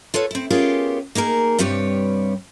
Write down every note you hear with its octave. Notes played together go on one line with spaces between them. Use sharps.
F4 A4 B4 C#5
C4 E4
B3 C#4 F4 G4 G#4 A#4
A#3 D#4 G#4 A#4
G2 C3 G3 G4 B4 C#5